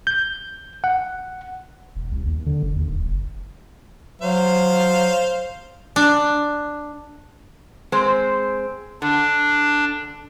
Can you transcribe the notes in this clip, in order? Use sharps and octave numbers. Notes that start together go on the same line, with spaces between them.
G6
F#5
E1
C2
D#2
D3
F#1
D#2
D1
F#1
F#3 C5 F5
D4
G#3 C4 C5
D3 D4